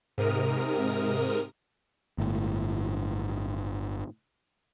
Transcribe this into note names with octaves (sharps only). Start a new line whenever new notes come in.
G#2 C3 A#4 D#6 F6
G1 A2